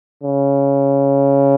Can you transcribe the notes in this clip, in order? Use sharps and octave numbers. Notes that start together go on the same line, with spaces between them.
C#3